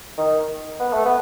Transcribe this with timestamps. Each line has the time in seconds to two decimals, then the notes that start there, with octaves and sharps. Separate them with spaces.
0.18 D#3
0.80 B3
0.93 A3
1.05 B3